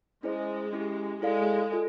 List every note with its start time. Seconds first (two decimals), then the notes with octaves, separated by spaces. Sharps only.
0.23 G#3 C#4 E4 G#4 C5 D#5
0.73 C#4 E4 G4
1.22 G#3 E4 A4 D5 F5
1.72 F4 A4